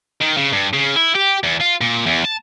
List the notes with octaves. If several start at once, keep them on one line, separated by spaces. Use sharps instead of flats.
D#3
C#3
G2
C#3
E4
G4
E2
F4
A#2
E2
A5